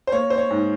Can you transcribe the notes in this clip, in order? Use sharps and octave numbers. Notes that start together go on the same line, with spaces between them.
C5
A#3 C#5
C5
C#5
G#2